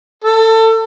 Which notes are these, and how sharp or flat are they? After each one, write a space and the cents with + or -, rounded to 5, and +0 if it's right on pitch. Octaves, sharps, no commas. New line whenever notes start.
A4 +25